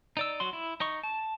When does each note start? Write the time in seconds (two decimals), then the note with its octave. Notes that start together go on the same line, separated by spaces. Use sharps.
0.17 D#4 D5 E6
0.40 F#3 F#4 C6
0.53 E4
0.80 D#4 D#5 C#6
1.03 A5